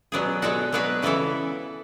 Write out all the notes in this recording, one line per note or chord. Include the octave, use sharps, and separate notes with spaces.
B2 F#3 B3 D4 G#4
B2 G#3 D4 F#4 A4
F#3 B3 D4 F#4 B4
C#3 E3 B3 E4 A4